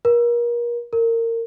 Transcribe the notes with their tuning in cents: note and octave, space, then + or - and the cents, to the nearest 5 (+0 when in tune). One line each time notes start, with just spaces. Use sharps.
A#4 +35
A#4 -25